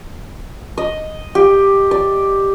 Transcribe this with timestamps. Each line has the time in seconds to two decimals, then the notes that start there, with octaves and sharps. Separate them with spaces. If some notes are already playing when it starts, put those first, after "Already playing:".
0.78 D#5
1.35 G4
1.91 D5